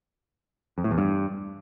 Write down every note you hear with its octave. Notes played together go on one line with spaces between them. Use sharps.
F2
A2
E2
G2